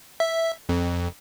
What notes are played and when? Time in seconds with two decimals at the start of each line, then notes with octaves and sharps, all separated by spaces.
0.20 E5
0.69 F2